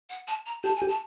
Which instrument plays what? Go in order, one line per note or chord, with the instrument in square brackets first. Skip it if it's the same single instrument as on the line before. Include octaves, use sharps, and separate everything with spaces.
[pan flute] F#5
A5
A#5
[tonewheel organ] G4 [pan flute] A5
[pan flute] G#5
[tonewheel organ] G4
[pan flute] A5